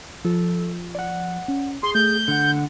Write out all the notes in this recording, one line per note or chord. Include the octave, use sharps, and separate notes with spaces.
F3 A4
D5 F#5
C#4
G#4 C6
A3 G6
D3 F#5